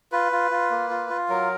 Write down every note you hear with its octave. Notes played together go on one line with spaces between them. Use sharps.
F4 B4
F4
F4
A#3
F4
F4
F#3 A#4